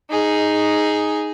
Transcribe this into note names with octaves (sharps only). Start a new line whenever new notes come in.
D#4 G#4